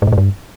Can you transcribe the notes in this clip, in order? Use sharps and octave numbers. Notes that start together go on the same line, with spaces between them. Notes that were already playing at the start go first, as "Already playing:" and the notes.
G#2
A2
G#2
G2